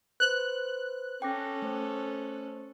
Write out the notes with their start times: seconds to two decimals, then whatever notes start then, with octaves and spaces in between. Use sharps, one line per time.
0.20 B4 C5 F#6
1.22 C#4 A4 G5 D6 A#6
1.62 A3 C5